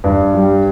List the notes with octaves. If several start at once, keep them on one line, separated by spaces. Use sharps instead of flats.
G2
G3